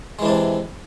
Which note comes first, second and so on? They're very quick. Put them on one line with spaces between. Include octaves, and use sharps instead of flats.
G#3 E3 D4 C3